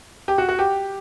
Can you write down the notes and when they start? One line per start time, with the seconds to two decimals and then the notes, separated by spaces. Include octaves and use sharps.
0.28 G4
0.38 F#4
0.49 F#4
0.59 G4